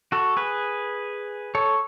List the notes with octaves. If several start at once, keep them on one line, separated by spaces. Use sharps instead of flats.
F#4 A4
G#4 B4
A4 C#5